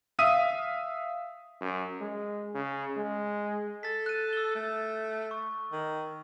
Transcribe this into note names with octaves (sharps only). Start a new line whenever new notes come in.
E5 F5 D#6 D#7
F#2
G#3
C#3
G#3
A4 A6 B6
F#6 D#7
E6 G7
A3
C#6
D#3